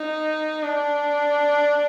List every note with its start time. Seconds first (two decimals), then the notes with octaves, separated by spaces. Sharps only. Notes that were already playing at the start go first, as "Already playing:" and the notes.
Already playing: D#4
0.63 D4